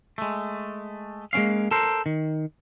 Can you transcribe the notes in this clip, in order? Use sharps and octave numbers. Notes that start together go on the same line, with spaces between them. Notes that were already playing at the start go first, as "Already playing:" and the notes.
G#3 A3
G#3 A#3 C4 C#4 F5
A4 A#4 C5
D#3